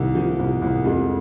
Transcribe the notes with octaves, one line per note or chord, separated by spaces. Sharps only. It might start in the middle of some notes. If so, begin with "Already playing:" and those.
Already playing: C2 D#3
F3
C2
C2
F2 G#3